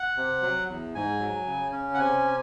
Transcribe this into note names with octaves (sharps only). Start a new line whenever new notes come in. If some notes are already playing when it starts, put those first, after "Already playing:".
Already playing: F#5
C3
F#3
E2
G#2 G#5
F#3
C#3
C#4
F#5
C3 G#5